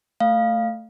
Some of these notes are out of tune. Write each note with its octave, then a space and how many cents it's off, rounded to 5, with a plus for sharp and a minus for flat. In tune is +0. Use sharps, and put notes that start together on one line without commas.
A3 +10 F5 +0